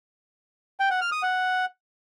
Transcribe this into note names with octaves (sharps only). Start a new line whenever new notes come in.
G5
F#5
F6
D#6
F#5